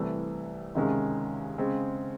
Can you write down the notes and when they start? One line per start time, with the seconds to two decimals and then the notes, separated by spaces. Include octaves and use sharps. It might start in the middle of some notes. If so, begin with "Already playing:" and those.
Already playing: C2 C3 E3 A3
0.75 C#2 C3 D#3 G#3 C#4
1.58 C#3 G#3 C4